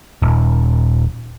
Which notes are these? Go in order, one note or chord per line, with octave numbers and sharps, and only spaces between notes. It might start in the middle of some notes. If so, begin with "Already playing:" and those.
D#1